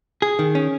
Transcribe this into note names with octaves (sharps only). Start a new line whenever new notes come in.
G#4
D#3
C#4